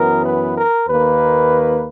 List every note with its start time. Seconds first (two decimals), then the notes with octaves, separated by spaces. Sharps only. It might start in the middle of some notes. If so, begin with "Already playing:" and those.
Already playing: F#2 E3 B3 A#4
0.25 B4
0.57 A#4
0.88 D#2 D#3 A#3 B4